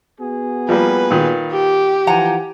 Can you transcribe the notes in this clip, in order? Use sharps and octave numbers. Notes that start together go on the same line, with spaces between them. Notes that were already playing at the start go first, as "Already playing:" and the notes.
B3 F#4 G#4
F3 G3 A#3 B4
A#2 D#3
G4
E3 F3 F#5 G#5 A#5